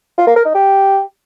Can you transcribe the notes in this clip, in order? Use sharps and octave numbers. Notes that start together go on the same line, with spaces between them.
F4
A#3
A#4
D#4
G4